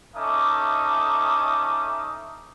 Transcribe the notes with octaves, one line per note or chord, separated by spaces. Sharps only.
C#4 D#4 A4 E5 D6 D#6